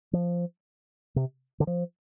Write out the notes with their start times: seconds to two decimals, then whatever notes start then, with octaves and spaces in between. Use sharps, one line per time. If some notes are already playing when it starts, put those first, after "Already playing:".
0.13 F3
1.16 C3
1.60 D3
1.67 F3